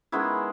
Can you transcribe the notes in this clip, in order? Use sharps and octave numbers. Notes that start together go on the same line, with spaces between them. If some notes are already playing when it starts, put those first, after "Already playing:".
D#3 G#3 B3 C#4 E4